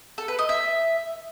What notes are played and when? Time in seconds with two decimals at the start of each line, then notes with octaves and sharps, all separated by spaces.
0.18 A4
0.28 B4
0.39 D#5
0.49 E5